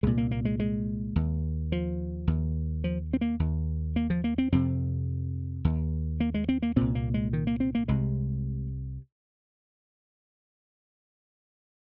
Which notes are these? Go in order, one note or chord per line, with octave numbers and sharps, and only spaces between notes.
C2 A#2 G#3
A#3
A#3
G#3
G#3
D#2
F3
D#2
F3
C4
A#3
D#2
A#3
F3
A#3
C4
F2 C3 C4
D#2
A#3
G#3
C4
A#3
C2 A#2 C4
A#3
G#3
D#3
A#3
C4
A#3
C2 C3 G#3